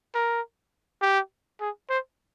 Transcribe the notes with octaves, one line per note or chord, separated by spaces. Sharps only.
A#4
G4
G#4
C5